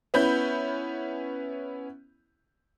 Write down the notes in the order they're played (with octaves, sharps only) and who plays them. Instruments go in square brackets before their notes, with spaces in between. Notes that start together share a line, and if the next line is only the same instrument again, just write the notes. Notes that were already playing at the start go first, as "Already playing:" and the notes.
[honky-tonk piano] B3 C#4 E4 B5 G6